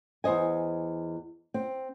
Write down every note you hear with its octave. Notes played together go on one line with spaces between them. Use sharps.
E2 C5 D#5 G#5
C4